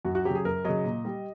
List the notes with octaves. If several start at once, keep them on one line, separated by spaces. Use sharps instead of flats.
F#2 F#4
F#4
C#3 F#3 G4
G#4
F#2 A#4
C#3 F#3 D#5
A#2
G3